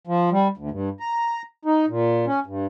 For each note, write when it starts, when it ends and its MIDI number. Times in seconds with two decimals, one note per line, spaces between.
0.07 0.30 53
0.32 0.48 55
0.57 0.69 38
0.71 0.89 43
1.00 1.42 82
1.65 1.85 63
1.88 2.26 46
2.27 2.40 61
2.46 2.66 43